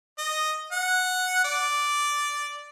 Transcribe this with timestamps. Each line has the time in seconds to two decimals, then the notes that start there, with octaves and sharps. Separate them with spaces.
0.18 D#5
0.72 F#5
1.44 D5